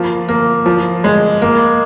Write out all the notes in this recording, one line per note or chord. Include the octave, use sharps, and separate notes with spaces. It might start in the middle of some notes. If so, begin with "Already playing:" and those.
Already playing: F3 A#3
A#3
F3
G#3
A#3